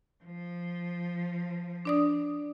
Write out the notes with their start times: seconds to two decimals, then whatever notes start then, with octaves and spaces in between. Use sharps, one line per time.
0.24 F3
1.85 D4 D5 D#6